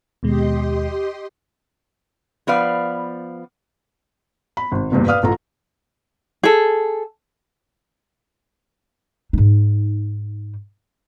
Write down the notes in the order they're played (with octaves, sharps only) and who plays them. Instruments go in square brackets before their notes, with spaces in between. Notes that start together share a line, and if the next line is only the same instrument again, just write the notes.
[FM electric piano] D#2 B2 G#3 [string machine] G4 D#5 C6
[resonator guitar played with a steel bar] F3 B3 B4 D5 F5
[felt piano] B5
G#1
F#1 E2 G2 A#2
B4 D5 F5 D#6 F6
A1 F4 A4 A#5
[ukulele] G#4 A4
[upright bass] G#2 D#4